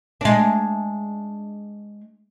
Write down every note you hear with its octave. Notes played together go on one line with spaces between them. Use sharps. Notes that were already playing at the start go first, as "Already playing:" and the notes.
G#3 D4